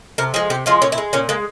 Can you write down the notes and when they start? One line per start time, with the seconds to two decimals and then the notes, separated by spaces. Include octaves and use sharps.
0.18 C3 A#4
0.34 F3 G#3 G#4
0.50 C3 G4
0.66 F3 G#3 F4
0.82 A#2 C#4
0.92 E4
0.98 G#3
1.13 A#2 C#4
1.29 G#3 A#3